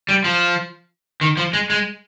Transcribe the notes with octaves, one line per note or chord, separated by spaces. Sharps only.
G3
F3
D#3
F3
G#3
G#3